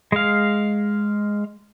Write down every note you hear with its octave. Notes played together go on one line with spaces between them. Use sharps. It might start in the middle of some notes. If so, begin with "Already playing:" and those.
G#3 F5